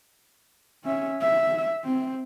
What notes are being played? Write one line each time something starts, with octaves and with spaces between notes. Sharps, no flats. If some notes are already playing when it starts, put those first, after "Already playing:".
C#4 E5
E5
C4